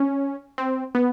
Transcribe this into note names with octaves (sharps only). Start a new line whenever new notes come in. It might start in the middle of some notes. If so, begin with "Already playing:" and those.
Already playing: C#4
C4
B3